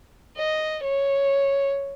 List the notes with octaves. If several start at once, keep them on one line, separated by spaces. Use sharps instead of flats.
D#5
C#5